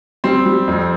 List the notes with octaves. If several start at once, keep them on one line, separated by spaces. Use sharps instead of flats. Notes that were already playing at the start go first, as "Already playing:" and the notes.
G3 C4
G3
F2